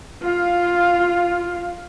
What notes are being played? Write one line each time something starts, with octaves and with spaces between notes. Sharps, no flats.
F4 F5